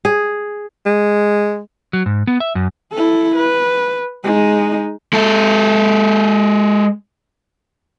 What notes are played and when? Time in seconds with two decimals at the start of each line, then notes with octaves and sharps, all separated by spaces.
0.05 G#4
0.86 G#3
1.93 F#3
2.06 G#2
2.27 B3
2.40 E5
2.55 F#2
2.92 E4 A4
3.36 B4
4.23 G#3 D#4
5.13 G#3 A4